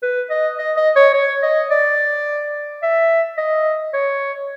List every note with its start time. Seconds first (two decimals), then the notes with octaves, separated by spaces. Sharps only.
0.03 B4
0.30 D#5
0.59 D#5
0.77 D#5
0.96 C#5
1.14 C#5
1.43 D#5
1.71 D5
2.82 E5
3.38 D#5
3.94 C#5